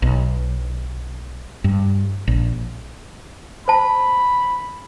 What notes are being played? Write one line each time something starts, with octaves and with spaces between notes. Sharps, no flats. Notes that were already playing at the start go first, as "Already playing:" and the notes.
B1
G2
A#1
C5 A5 B5